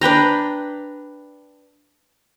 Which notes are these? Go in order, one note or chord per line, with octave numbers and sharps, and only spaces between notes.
D4 B4 G5 A#5